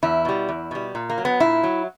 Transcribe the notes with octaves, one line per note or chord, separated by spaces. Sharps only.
E2 E4
B2 G3
E2
B2 G3
A#2
A#3
F#3
B3
A#2 E4
F#3